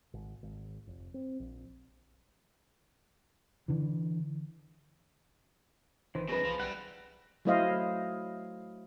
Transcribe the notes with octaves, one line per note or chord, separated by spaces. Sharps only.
G#1
G#1
F1
C4
A#1
D3 E3
G#1 D#3 E3 C5
F#2 B2 G#4 B4 A#5
C2 F3
B1 G3 E4 F#5
F#3 A3 E4 C5 D#5 F5